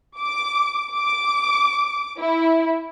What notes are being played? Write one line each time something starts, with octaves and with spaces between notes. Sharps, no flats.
D6
D6
E4